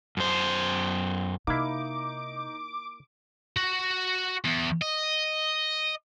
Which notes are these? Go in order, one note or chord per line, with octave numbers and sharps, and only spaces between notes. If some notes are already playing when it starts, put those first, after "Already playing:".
F#2 C5
C3 A#3 D#4 E4 D6
F#4
E2
D#5